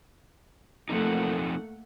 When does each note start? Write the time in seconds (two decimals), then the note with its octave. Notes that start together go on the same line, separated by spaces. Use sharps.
0.89 F3 A3 A#3 C4 D#4 F#5